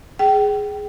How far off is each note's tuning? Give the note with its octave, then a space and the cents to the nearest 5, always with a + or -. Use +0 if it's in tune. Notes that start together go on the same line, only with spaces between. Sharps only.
G#4 +0 G5 -25